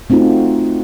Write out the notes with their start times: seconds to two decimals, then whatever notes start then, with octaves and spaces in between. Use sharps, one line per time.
0.10 A3 C4 D#4 F4 F#4